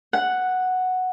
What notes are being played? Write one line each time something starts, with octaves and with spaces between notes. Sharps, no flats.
F#5